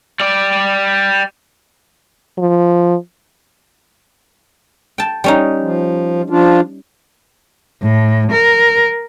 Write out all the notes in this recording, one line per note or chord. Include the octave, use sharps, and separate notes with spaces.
G3 D5
F3
G5 A5
G3 C#4 D#4
F3
F3 D4 F4
A2
A#4